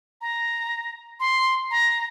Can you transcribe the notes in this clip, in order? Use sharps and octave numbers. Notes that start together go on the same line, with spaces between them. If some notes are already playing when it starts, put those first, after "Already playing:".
A#5
C6
A#5